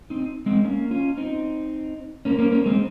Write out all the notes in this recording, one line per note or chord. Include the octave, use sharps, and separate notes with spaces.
C4 D#4
G#3 C4
A#3 C#4
C#4 F4
C4 D#4
A#3 C#4
A#3 C#4
A#3 C#4
G#3 C4